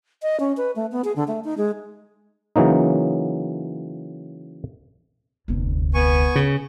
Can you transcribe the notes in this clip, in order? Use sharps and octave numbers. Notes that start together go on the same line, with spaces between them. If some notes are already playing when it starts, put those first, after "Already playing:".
D#5
C#4
B4
A3
B3
G#4
D3
A3
D#4
G#3
C#3 E3 F#3 A#3 D#4
F1 D2
B3 G#5 C#6
C#3